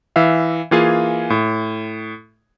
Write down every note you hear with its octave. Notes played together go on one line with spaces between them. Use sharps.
E3 E5 F5
E3 A#3 F4 G#4 F5 G#5
A2